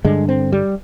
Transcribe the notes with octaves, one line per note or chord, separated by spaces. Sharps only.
G2 D3 G#3
C4
G3